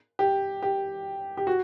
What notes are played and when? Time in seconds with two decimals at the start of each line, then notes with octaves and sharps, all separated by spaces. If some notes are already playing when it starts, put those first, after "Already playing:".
0.19 G4
0.62 G4
1.37 G4
1.47 F#4